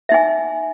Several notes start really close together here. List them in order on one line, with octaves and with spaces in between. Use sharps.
E5 D#4 G#5